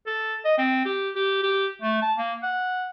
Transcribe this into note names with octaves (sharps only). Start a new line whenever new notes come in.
A4
D#5
C4
G4
G4
G4
A3
A5
A#3
F#5